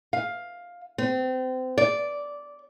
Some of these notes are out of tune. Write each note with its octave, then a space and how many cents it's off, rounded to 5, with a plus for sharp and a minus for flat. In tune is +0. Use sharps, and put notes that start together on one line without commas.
F5 +10
C4 -30
D5 -10